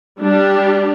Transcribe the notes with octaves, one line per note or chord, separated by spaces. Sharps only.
G3 D4 G4